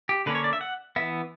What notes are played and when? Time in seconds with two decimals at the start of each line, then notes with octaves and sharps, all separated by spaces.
0.09 G4
0.26 D3 A#3 C#4 B4
0.35 C#5
0.44 D5
0.53 E5
0.61 F#5
0.96 E3 B3 E5